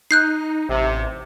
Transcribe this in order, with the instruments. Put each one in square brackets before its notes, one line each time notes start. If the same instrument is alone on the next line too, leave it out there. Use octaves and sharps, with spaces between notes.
[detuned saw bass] D#4 [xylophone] F#6 G6 C7
[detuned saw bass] A1 [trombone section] C3